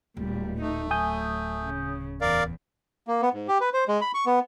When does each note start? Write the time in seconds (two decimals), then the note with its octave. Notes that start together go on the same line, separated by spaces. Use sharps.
0.17 D1 A#2 G3
0.61 A3 D#4
0.91 F#3 G#5 D#6 G6
1.64 C#3
2.21 E2 A#4 D5 F5
3.08 A#3
3.22 B3
3.34 G#2
3.48 G4
3.61 B4
3.74 C5
3.88 G#3
4.01 B5
4.14 C#6
4.26 B3